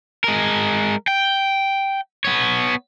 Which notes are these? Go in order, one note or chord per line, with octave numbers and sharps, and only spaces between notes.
G#3 A#4
G5
B3 C#5